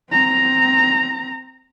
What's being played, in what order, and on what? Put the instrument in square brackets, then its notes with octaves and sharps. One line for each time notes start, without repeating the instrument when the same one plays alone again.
[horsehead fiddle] C4 A#5